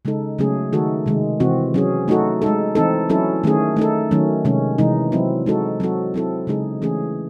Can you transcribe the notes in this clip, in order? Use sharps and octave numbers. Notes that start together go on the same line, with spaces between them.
C#3 G#3 D#4 A4
C#3 F#3 A3 C#4 G#4
D#3 A3 D#4 F#4 A4
C3 D#3 G#3
C3 E3 C4 F#4
F#3 C#4 G#4
A3 D#4 F#4 A4
G#3 D#4 A4
E3 C4 D#4 A4
F#3 C#4 E4 A4
D#3 A3 C#4 G#4
A3 D#4 A4
D#3 F#3 A3 C#4
C3 D#3 G#3 C#4
C3 E3 G#3 D#4
F#3 C4 E4
G#3 D#4 F#4 A4
F#3 C4 F#4 A4
F#3 C4 E4 A4
C#3 G#3 D#4 G#4
E3 A3 C#4 G#4